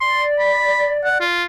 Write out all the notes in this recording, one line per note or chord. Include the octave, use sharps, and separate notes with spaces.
D5 C6
B5
F#5
F4